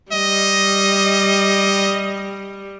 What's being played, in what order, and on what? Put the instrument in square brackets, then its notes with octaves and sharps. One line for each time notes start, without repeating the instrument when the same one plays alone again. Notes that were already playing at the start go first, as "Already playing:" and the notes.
[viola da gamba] G3 [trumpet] D#5